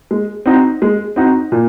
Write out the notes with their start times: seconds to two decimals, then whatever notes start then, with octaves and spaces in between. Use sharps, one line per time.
0.11 G#3
0.46 C4 D#4 F#4
0.82 G#3
1.16 C4 D#4 F#4
1.52 A#2